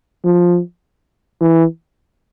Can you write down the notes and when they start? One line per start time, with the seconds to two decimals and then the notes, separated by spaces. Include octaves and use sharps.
0.24 F3
1.41 E3